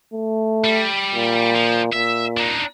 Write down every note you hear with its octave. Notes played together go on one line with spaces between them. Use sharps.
A3
G3
A#2
F3
A#2 E5
D4 D#4